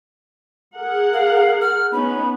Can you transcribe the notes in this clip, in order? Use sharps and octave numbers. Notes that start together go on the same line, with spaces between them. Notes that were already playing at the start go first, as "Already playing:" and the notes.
G#4 A#4 F#5
F5
F6
B3 C#4 D#4 B5